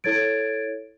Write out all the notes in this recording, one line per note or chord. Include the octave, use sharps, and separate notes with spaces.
E4 A4 C#5 G#6 A6 D7